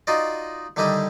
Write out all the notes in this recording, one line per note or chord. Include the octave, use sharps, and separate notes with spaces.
D#4 F4 F#4 D5 D#5
D3 D#3 G3 D4 E4 D#5